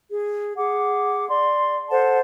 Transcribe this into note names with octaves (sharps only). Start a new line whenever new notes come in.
G#4
G#4 F#5 D6
D5 C6
A4 C5 F#5 A5